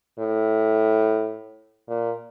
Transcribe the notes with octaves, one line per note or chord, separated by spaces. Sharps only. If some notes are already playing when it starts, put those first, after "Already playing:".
A2
A#2